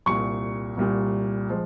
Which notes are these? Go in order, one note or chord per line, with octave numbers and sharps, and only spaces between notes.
C2 A#2 G3 C#6
C2 A#2 G3
F3 G#3